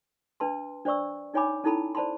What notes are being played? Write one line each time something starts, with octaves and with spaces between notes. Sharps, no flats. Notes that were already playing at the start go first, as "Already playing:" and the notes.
D4 B4 A5 C6
D4 C5 D5 C#6 E6
D4 D#4 C#5 G#5 B5 D6
C#4 D#4 E4 A4 A5 B5
C5 D5 A5 B5 C6